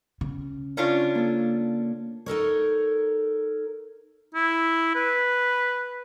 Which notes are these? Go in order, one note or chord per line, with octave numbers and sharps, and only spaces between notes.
C#3
C#4 D4 F4
A#3 A4
D#4 A4 A#4 C#5
E4
B4